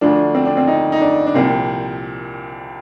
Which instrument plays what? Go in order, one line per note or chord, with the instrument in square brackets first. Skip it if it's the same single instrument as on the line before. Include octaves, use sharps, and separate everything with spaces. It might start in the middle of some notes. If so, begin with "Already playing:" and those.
[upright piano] D2 D3 F3 D4
C4
D4
C4
D#4
D#4
D4
D4
C2 A#2 F3 C4